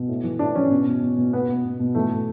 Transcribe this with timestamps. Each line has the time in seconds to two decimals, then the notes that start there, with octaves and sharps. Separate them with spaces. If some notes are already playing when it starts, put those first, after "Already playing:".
Already playing: B2
0.08 A2
0.24 E3
0.39 A2 D4
0.55 E3 C#4
0.70 B2
0.86 B2
1.02 B2
1.17 B2
1.33 B2 B3
1.48 B2
1.65 B2
1.79 B2
1.95 E3 A3
2.11 A2